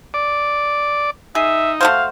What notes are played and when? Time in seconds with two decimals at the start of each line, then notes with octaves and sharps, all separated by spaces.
0.14 D5
1.35 D#4 G#4 E5
1.81 A3 F#4 C5 F5